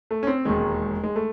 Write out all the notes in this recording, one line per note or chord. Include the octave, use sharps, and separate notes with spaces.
A3
C#4
C4
E1 D#2 D#3 G#3
G#3
A3